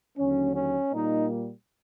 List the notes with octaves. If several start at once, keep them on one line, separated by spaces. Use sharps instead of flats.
D#2 D3 F#3 C#4
C#4
A#2 G3 A#3 D#4